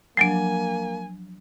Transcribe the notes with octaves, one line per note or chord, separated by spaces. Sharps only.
F3 F#3 A#3 D4 G#5 C7 D7